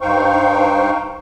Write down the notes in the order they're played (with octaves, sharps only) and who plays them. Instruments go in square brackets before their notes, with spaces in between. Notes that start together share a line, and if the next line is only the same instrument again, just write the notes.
[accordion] G2 D#4 C5 F5 G5 C#6